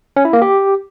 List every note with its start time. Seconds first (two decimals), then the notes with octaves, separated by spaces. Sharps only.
0.16 C#4
0.25 E4
0.33 A#3
0.42 G4